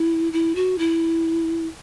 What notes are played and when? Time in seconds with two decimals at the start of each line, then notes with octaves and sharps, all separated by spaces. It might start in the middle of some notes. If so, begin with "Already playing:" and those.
Already playing: E4
0.33 E4
0.55 F#4
0.79 E4